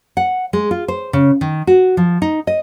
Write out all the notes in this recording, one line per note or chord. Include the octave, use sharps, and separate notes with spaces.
F#5
G#3
F4
C5
C#3
D#3
F#4
F3
D#4
D#5